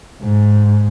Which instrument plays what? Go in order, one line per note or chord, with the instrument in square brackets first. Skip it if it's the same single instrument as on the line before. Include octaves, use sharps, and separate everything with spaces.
[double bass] G#2